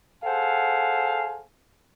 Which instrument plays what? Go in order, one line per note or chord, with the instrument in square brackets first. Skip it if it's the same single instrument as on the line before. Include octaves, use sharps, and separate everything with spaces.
[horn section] G#4 A4 C5 F5 F#5 G#5